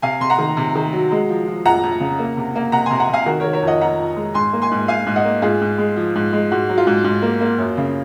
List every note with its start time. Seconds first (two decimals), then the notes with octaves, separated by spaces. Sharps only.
0.02 C3 F5 G#5
0.20 C3 C6
0.30 F#5 A#5
0.38 D#3
0.57 C3
0.75 D#3
0.93 F#3
1.12 G#3
1.29 F3
1.47 F3
1.65 F2 F#5 A#5
1.83 F2
2.00 C#3
2.19 A#3
2.37 C3
2.56 A#3
2.72 C3 F#5 A#5
2.86 C3 G#5 C6
3.00 F#5 A#5
3.09 C3 F5 G#5
3.26 D#3 F#4 A#4
3.40 A#4 C#5
3.44 D#3
3.53 A#4 C#5
3.63 F2 D#5 F#5
3.81 F2 F#5 A#5
3.98 F2
4.16 G#3
4.34 G#2 G#5 C6
4.53 A#3
4.62 G#5 C6
4.71 G#2
4.88 G#2 F5 G#5
5.06 G#2
5.16 D#5 F#5
5.25 A#3
5.42 G#2 F4 G#4
5.61 G#2
5.78 G#3
5.97 F3
6.15 G#2
6.33 G#3
6.51 G#2 F#4
6.69 F#3
6.78 F4
6.87 G#2
7.04 G#2
7.22 A#3
7.41 A#3
7.58 F#2
7.77 C#3